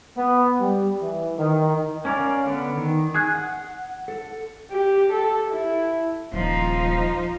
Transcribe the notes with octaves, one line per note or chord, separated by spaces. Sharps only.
B3
G3
E3
D#3
C#4 A#4 D5 F5
D3 B3
D#3
G#4 F#6
F#5
A4
G4
A4
E4
D#1 F3 D#4